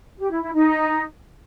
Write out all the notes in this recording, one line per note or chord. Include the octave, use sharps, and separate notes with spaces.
G4
E4
E4
D#4